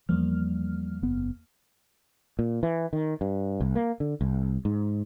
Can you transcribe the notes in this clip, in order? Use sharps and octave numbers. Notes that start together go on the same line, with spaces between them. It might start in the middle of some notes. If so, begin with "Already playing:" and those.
E2 F3 G3 A#3 F6
F#1 B3
A#2
E3
D#3
G2
C2
A#3
D3
C2
G#2